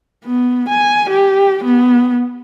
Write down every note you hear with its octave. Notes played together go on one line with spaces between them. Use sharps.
B3
G#5
G4
B3